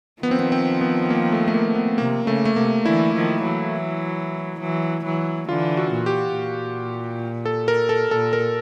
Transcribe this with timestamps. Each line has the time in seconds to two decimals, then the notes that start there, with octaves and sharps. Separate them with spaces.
0.22 D#3 F3 B3
0.31 C4
0.39 B3
0.52 C4
0.81 B3
1.10 A#3
1.32 A3
1.48 A3
1.54 A#3
1.76 B3
1.98 C3 A#3
2.27 C#3 A3
2.45 A3
2.56 C3 A#3
2.85 D3 E3 E4
3.14 D#3 F3
3.43 E3 F#3
4.60 E3 F#3
5.04 E3 F#3
5.48 D3 E3 F4
5.77 F#4
5.91 A#2
6.06 G4
6.35 A#2
7.45 A4
7.68 A#4
7.89 A4
8.11 A#2 A4
8.33 A#4